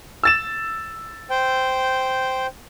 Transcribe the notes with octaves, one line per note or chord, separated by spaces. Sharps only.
E6 A6 E7
C5 G5